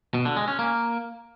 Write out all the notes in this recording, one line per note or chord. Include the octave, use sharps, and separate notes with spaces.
B2
D3
G#3
C#4
A#3